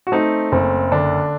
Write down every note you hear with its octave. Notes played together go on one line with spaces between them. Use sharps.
F#4
A3 C4 D#4
F#1 C4
D3 D4